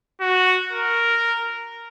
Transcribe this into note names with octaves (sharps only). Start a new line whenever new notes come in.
F#4
A#4